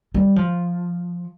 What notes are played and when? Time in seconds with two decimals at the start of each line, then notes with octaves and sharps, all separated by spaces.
0.14 G3
0.36 F3